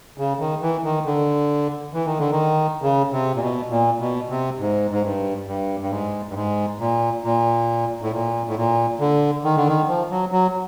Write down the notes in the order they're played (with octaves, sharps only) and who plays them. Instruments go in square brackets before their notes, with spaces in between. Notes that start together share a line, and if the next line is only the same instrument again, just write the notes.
[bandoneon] C#3
D#3
E3
D#3
D3
E3
D#3
D3
D#3
C#3
C3
A#2
B2
A#2
B2
C3
G#2
G#2
G2
G2
G2
G#2
G2
G#2
A#2
A#2
A2
A#2
A2
A#2
D3
D#3
D3
D#3
F3
F#3
F#3